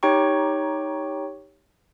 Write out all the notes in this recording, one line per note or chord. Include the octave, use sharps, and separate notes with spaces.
D#4 G4 C#5 G5 A#5 C#6